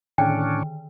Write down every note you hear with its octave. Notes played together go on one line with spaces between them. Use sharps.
A2 D3 D#3 C#4 D4 G5